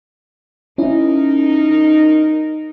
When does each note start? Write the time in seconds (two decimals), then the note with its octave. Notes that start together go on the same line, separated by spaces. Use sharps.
0.78 C#4 D#4 E4 A#4